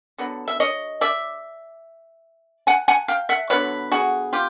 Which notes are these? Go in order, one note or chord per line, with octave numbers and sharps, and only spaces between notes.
D3 F#3 B3
E5
C#5 D#5
D5 E5
F#5 G#5
F#5 G#5
F5 G5
E5 F#5
D3 F#3 B3 B4 C#5
F#4 G#4
F4 G4